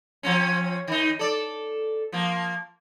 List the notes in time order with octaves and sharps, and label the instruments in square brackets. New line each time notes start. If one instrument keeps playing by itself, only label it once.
[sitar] F3 C4 C#4
D#3 D#4
A4 D5
F3 A#3